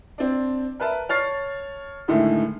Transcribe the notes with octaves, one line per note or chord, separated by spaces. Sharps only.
C4 D4
A#4 B4 E5 A5 B5
C#5 A5 F6 A6 C7
A2 D3 D#3 G#3 A3